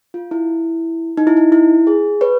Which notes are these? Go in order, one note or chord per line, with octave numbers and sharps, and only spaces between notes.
F4
E4
D#4
E4
D#4
E4
G#4
B4 C#5